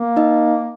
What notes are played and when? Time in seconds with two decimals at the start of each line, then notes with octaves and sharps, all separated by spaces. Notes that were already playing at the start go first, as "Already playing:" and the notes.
Already playing: A#3
0.16 D#4 D#5